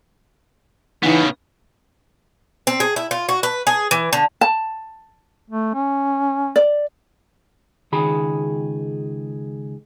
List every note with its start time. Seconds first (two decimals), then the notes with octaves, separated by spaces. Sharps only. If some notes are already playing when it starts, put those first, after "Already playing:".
1.03 C#3 E3 B3 D#4
2.67 C4
2.80 G#4
2.96 E4
3.11 F4
3.29 F#4
3.43 B4
3.67 G#4
3.91 E3
4.13 D3
4.41 A5
5.50 A3
5.74 C#4
6.56 D5
7.92 C#2 D#3 G#4 B5